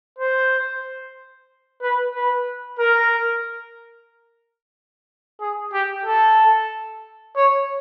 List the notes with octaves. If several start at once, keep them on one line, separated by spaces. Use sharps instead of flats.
C5
B4
B4
A#4
G#4
G4
A4
C#5